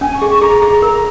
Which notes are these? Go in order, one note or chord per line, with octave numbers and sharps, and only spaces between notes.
C#4 G#5
C#6
G#4
C#6
G#4 A#5
G#4
A#4